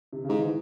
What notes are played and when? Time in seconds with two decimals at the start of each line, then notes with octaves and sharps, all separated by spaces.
0.13 C3
0.24 C#3
0.29 G#2
0.37 E3